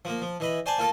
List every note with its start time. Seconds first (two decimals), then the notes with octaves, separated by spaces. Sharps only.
0.05 F3 A#3
0.22 F3
0.40 E3 D#5 B5
0.66 C5 D5 G#5 A5
0.78 A#3 F4 A4 A5